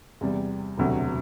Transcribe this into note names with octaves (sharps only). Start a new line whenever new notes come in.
E2 C3 G3
E1 D2 C3 F#3